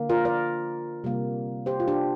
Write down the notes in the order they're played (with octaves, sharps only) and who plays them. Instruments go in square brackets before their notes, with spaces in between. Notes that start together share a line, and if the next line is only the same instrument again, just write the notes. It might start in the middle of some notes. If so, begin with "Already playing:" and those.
Already playing: [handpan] D3 A#3
F4 A#4
A#4 D5
C3 G3 A#3
G4 C5
F4
D4 G4